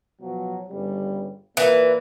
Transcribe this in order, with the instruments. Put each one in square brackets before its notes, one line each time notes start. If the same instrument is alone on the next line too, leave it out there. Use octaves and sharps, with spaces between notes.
[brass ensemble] B2 F3 F#3
G1 C#3 G3
[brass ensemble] A#2 A#3 [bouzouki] E3